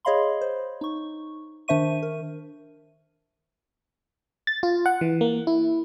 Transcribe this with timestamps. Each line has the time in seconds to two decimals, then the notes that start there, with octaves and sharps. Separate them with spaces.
0.05 G#4 C#5 D#5 F5 B5 C6
0.41 C5
0.81 D#4 C#6
1.68 D#3 D4 C5 E5 C#6 D#7
2.03 A#4
4.47 A6
4.63 F4
4.86 F#5
5.01 E3
5.21 A#3
5.47 E4